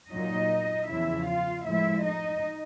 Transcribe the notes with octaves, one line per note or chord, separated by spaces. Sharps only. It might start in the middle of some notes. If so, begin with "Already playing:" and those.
A#2 F#3 D#4 D#5
E2 C#3 F3 E4 E5
F4 F5
A2 F3 G#3 E4 E5
D#4 D#5